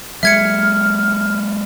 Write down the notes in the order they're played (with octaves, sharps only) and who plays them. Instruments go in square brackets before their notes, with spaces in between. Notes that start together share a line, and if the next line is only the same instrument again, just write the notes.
[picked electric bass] F#3 G#3 [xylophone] E5 G#6 C#7 [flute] F6